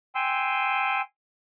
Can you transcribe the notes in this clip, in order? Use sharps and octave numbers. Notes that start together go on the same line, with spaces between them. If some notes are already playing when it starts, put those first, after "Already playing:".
G5 G#5 C6 E6